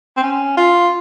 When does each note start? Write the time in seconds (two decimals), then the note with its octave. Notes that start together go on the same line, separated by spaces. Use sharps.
0.17 C4
0.22 C#4
0.57 F4